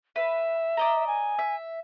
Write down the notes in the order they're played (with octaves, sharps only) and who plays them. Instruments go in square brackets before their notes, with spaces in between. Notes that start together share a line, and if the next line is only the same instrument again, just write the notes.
[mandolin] B4 [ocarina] E5
[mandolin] D5 D#5 A#5
[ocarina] G#5
[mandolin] E5